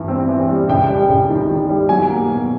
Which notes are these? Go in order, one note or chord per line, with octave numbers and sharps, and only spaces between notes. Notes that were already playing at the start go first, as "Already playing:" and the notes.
Already playing: G2 E3
C4
E3
G3
C#2 G5
G3
C#2
D#3
D#3
G3
F#3 G#5
A#3
B2